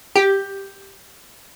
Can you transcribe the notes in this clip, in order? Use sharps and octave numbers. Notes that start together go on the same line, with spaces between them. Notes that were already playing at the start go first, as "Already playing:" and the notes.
G4